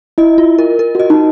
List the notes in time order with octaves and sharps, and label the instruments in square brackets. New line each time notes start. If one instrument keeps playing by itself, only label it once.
[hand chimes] E4 [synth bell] D#5
[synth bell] F4
A#4
A#4
[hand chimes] F#4 [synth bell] D#5
[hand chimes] D#4